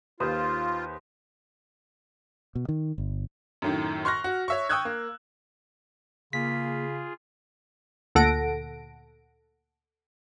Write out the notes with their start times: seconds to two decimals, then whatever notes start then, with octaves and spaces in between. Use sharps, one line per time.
0.20 D#2 F4 B4 C5 D#6
2.55 B2
2.69 D#3
2.98 G1
3.62 F#2 A2 D#3
4.05 C6 C#6 F6 F#6 A#6
4.24 F#4
4.48 C#5 E5 C#6
4.69 G5 C#6 D#6 E6 F#6 G#6
4.85 A#3
6.33 C#3 A#3 F4 G#4 B6
8.15 D2 A#2 A4 F#5 A#6 D7